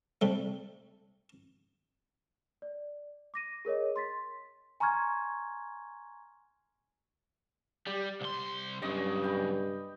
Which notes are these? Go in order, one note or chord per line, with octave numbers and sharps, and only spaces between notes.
C3 G3 A3
D5
D6 A#6 D#7
G#4 A#4 C#5 D#5
C6 A6 B6
G#5 A#5 C6 C#6 F6 G#6
G3 G4
C2 C6
B1 G2 C#3 D#5
G5 B5